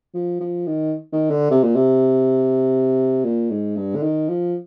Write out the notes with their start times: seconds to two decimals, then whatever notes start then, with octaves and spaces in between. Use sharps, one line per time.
0.14 F3
0.40 F3
0.67 D#3
1.12 D#3
1.31 D3
1.51 C3
1.63 A#2
1.76 C3
3.25 A#2
3.51 G#2
3.77 G2
3.95 D3
4.02 D#3
4.29 F3